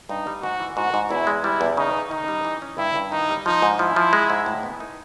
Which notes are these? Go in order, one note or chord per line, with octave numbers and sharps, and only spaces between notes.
G2 D#4
G3
G#2 F#4
E3
G#2 F#4
G#2
E2 E4
G#3
G3 E4
E2
C#3 D#4
C#3
D#3 D#4
G3
E3
C#4
G2 E4
G2
D#3 D#4
G3
F3 D#4
G#2
F3 E4
F3
G#3
G#2
A2
B3
D#4